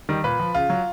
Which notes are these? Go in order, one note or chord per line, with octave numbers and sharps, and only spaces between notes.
D#3 G3
A#2 B4
F3
C#3 F4
F#3